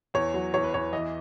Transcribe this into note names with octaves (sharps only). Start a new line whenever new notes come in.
E2 C#5
F#3
E2 C#5
B4
E2 C#5
E3 D#5